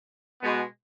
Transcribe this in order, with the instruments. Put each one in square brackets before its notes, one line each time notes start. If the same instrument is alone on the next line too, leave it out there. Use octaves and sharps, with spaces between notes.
[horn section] B2 G#3 B3